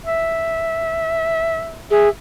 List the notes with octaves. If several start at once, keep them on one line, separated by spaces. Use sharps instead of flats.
E5
G#4 E5